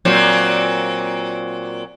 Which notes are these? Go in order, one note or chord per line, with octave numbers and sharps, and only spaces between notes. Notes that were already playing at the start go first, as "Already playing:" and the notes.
A#2 F#3 C4